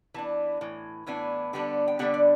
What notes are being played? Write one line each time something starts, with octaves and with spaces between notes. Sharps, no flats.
E3 B3 D4 A5
A2 E3
A2 E3 B3 D4
D3 G3 B3 D4
G5
D3 G3 B3 D4 F#5
D5